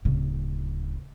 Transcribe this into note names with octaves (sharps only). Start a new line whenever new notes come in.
D1 C#3